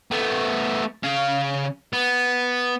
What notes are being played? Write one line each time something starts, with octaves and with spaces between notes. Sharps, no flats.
A3 B3
C#3 F5
B3